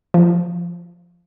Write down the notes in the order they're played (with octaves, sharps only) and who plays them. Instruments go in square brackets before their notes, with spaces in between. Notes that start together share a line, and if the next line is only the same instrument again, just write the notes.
[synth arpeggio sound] F3